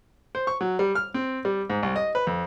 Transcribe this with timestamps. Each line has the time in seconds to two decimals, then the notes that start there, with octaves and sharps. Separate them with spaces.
0.35 C5
0.47 C#6
0.61 F#3
0.79 G3
0.95 F6
1.14 C4
1.45 G3
1.70 G#2
1.83 C2
1.96 D#5
2.15 B4
2.27 F2